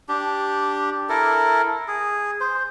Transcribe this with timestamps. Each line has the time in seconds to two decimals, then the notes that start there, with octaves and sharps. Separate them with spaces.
0.09 D4 G4
1.09 E4 A4 A#4
1.88 G#4
2.41 C5